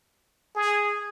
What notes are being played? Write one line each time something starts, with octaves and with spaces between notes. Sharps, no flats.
G#4